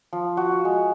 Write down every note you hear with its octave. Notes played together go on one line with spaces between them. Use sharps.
F3
F#4
F4
G#3